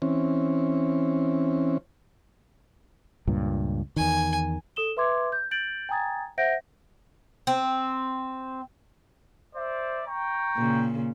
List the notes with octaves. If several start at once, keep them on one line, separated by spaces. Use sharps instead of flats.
E3 C4 C#4
C#2 G2 A#2
E2 D#3 G#5
A4 D#6 E7 G7
B4 E5 C6 D6 G#6
G6
G6 A6 D7 F#7
G5 G#5 A#5 D#6 G#6 A6
C5 E5 F#5 G6 A#6 D7
C4
C5 D5 E5
G5 A#5 C#6
A#2 C#3